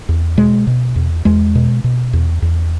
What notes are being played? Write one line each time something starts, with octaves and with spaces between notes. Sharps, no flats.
E2
B2 G#3
B2
E2
E2 G#3
B2
B2
E2
E2